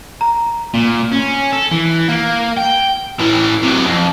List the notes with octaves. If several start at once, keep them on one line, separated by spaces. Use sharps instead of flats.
A#5
A#2
C#4
A4
E3
A#3
G5
A2 E3
C3 F#3
F2